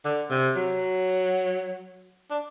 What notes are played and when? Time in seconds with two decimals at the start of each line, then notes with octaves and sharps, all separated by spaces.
0.05 D3
0.31 C3
0.56 F#3
2.31 D4